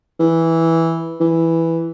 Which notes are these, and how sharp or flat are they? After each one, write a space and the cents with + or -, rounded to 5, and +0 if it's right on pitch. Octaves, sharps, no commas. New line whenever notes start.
E3 -5
E3 +0